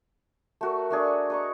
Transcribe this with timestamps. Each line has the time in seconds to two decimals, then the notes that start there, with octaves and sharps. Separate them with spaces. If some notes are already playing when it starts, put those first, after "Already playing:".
0.61 A3 F#4 A#4
0.90 A3 D4 G#4
1.30 D#5 A#5 C#6